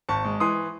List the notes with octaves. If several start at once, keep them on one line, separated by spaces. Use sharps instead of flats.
G#1 A5 C#6
G#3
E3 C6 D#6